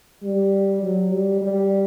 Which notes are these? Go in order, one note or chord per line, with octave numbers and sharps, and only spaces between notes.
G3
F#3
G3
G3